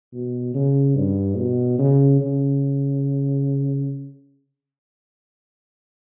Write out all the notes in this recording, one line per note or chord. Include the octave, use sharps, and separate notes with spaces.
B2
C#3
G2
B2
C#3
C#3